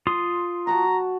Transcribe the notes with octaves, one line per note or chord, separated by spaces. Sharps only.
F4 C6 D#6
F#4 F#5 A5 A#5